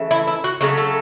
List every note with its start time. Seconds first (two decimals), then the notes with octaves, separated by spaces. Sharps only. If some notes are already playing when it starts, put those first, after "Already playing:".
Already playing: C#3 E3 A3
0.11 E4
0.27 E4
0.44 F#4
0.61 C#3 F#3 A3 F#4
0.78 A4